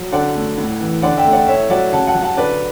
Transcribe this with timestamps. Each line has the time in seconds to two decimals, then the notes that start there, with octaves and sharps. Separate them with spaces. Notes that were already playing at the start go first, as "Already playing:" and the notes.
Already playing: F#3
0.12 D3 D5 F#5
0.35 A3
0.58 A2
0.80 E3
1.02 D3 D5 F#5
1.17 E5 G5
1.25 A3
1.32 D5 F#5
1.47 A2 C#5 E5
1.70 F#3 D5 F#5
1.92 C#3 F#5 A5
2.07 F#5 A5
2.14 F#3
2.23 F#5 A5
2.37 D3 B4 D5